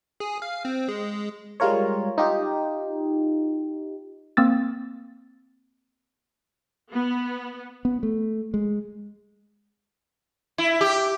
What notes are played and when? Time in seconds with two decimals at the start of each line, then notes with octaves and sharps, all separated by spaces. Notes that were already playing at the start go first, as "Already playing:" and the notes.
0.20 G#4
0.42 F5
0.65 C4
0.89 G#3
1.60 G3 G#3 F4 A#4 C#5
2.18 D#4 F4 G4
4.37 A#3 C4 E6 A6
6.92 B3
7.85 B3
8.03 A3
8.54 G#3
10.58 E4
10.81 G4